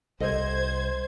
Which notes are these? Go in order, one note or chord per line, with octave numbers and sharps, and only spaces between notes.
C2 A4 C5 D#5 G#6